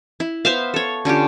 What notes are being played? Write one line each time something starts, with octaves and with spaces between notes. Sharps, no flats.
E4
B3 C5 E5 F5
A4 C#5
D3 C#4 F4 G4